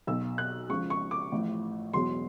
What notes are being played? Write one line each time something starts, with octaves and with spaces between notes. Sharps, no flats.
B1 B2 F#3 E6
F#6
C#2 C#3 F3 C#6
C#6
D6
A1 A2 F3
E1 E2 B2 F#3 C6